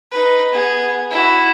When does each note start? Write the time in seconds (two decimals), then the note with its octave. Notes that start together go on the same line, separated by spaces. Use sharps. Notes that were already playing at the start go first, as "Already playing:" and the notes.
0.12 D#4 B4
0.53 B3 G#4
1.11 E4 F#4